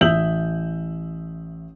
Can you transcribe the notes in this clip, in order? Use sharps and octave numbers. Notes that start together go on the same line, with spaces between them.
A1 E5 D#6 E6 G6 F#7